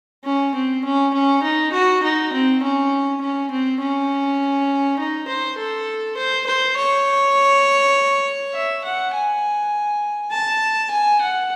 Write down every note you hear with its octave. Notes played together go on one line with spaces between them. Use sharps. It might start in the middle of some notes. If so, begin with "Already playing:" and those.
C#4
C4
C#4
C#4
D#4
F#4
D#4
C4
C#4
C#4
C4
C#4
D#4
C5
A4
C5
C5
C#5
E5
F#5
G#5
A5
G#5
F#5